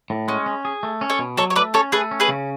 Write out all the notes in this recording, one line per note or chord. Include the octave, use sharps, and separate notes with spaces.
A2
G#3 C#4
C#4
G#4
A3
C#4
A4 C#5
B2
F#3 A4 C#5
C#5
A3 B4 D5
C#4 A4 C#5
A3 G#4 B4
C#4
G#4 B4
C#3